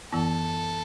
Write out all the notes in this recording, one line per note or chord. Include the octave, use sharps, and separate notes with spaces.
F#2 E3 B3 E4 A4